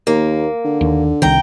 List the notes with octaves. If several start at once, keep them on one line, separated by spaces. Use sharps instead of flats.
D#2 A#3
D3
D#2
C2 D#3 G5 A#5